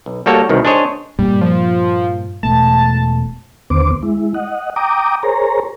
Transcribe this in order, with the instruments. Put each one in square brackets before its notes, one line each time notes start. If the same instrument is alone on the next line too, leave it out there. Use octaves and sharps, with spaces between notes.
[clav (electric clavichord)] B1
G3 A#3 F#4 A4 C#5
C2 B2 D#3
D4 G#4 C5 C#5 D#5
[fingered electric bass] G2 A#2 A#3 [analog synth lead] G3
[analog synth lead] F3
[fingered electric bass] E1 B2 A3 [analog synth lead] A5
[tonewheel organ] D#2 D3 B3 C5 D6
G#3 E4
D#5 F#5
G5 A#5 D6 D#6
G#4 A#4 C5 C#5 A#5